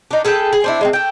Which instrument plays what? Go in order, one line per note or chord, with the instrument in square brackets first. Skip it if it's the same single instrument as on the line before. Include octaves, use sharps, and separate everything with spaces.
[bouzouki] D4 D#4
G#4 A4 B4 G5
G#4
C4 D4 E4
G#3 A#3 C4
A3 G5